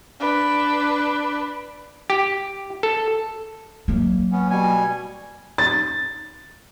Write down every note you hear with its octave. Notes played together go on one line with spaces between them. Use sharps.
D4 B4
G4
A4
F#3 A#3
B3 C#4
B2 G3 G#5
A6